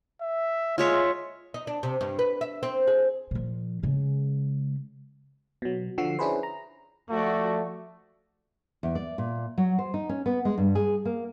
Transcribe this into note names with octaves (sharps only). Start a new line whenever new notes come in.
E5
G#3 F4 C#5 E5
D#4
D4
C3
G2
B4
E5
C4
G#4
A#2 F3
C#3 G#3
B2 F#3
D3 F3 F#4 E6 C7
C#4 D4 E4 G#4 B4 C5
A#5
F3 A3 F#4 D5
E2
D5
A#2
F#3
C5
D#4
C#4
B3
G#3
G2
G#4
A#3